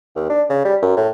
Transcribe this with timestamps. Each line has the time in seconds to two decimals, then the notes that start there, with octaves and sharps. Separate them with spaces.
0.16 D#2
0.29 D4
0.50 C#3
0.65 G3
0.82 F#2
0.97 A2